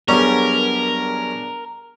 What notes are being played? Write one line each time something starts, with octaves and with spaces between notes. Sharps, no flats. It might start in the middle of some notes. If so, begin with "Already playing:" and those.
F#2 G3 B3 C#4 D4 G#4 A#4